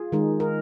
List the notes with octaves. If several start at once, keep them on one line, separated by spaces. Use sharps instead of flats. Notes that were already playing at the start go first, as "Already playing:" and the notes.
Already playing: F4 G#4
D#3 G#3 D#4
A#4